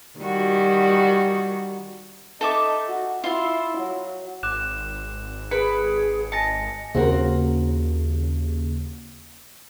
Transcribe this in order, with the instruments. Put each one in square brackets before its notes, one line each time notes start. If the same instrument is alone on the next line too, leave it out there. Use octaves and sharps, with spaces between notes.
[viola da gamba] D#3 G3 F#4
[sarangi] D#4 [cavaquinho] A4 E5 D6
[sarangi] F#4
[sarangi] E4 [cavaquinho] F4 C6
[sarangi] F#3
[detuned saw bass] G#1 [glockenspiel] D6 F#6 E7
[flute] G#4 [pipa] B4 [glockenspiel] C#7 D7
[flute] D#5 [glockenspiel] G#5 A#6 C#7 [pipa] A5
[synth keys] D#2 C#3 [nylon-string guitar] C4 F#4 A#4